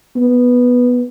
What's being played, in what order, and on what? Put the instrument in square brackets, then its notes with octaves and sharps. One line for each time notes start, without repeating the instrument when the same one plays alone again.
[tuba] B3